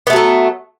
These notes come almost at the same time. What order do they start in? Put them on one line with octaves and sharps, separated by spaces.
B3 A3 F#3 A4